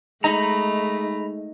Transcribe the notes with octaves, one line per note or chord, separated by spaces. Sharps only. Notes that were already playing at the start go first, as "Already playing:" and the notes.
G#3 A3 D#4 A#5 B5